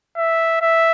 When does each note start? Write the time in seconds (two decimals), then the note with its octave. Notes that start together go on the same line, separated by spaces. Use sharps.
0.17 E5
0.62 E5